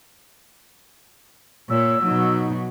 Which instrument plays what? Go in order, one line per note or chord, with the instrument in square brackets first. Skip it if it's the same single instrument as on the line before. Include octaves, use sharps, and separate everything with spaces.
[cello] A#2 [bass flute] C#5 [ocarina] E6
[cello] B2 F#3 [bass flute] D#4